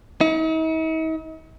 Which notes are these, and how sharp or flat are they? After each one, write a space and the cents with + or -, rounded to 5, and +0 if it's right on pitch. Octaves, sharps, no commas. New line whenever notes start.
D#4 +45